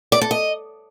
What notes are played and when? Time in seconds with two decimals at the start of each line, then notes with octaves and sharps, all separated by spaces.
0.12 D5
0.21 A4
0.31 D#5